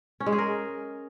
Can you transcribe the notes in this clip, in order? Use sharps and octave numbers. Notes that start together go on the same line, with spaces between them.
C#4
G#3
G#4
A#4